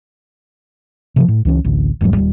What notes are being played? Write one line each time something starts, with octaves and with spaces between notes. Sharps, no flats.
C3 E3 F3
A2
C#2 E3 C#4
A1 D2
E1 G#2 B2 F#3
D#1 C#2 G3